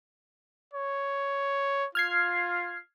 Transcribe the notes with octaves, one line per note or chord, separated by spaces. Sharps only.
C#5
F4 F6 G#6 C7